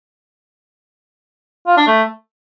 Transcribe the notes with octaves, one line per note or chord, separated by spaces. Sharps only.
F4
D4
A3